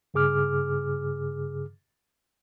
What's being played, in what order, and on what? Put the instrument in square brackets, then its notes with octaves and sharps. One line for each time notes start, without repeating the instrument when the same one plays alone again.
[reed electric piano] G2 C#3 G#4 D6 F6